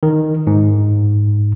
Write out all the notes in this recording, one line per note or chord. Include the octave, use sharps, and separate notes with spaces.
D#3
G#2